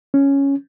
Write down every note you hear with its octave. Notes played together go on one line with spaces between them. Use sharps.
C#4